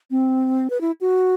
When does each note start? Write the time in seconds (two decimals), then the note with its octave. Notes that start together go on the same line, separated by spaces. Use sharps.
0.11 C4
0.70 B4
0.81 E4
1.01 F#4